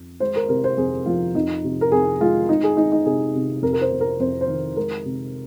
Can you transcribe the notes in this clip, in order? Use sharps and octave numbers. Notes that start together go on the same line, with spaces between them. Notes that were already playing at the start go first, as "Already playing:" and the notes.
Already playing: F2
G#3 C5
A#4
C3 A#4
C5
F2 G#4
F3 F4
F2 D#4
C3
A#4
F2 G#4
G#3 F4
G#3 D#4
G#4
G#3 D#4
D#4
C3 G#4
C3
F2 A#4
A#4
C5
C3
A#4
F2 C5
C5
D#3
G#3 A#4
C3